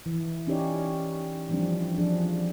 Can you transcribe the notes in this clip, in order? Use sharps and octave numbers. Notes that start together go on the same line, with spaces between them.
E3
C#4 D#4 G4 C#5 D5
E3 F3 G3 C4 D4
F3 D4 G#4